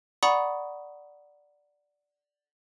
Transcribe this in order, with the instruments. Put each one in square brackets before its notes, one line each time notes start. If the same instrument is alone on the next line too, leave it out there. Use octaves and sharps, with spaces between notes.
[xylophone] D5 F#5 A#5 B5 C#6 D#6